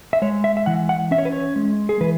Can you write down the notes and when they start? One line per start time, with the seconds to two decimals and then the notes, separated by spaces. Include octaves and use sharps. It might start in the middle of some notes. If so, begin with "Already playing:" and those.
0.13 E5
0.22 G#3 C#5
0.44 E5
0.57 E5
0.66 E3 F#5
0.89 F#5
1.11 C#4 E5
1.18 C#5
1.25 B4
1.32 C#5
1.56 G#3
1.89 G#4
2.01 E3 B4